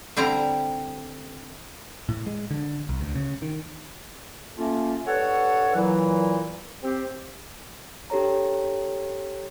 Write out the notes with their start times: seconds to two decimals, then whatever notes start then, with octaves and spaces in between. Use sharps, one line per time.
0.17 D3 G3 C4 E4 A#5
2.09 A2
2.26 G#3
2.51 D3
2.89 C2
3.01 D2
3.15 C#3
3.42 D#3
4.57 A3 A#3 C#4 F4
5.07 G2 A4 C#5 F#5
5.75 A#2 E3 F#3 E4
6.82 C4 G4
8.10 D4 G4 A4 C#5 A#5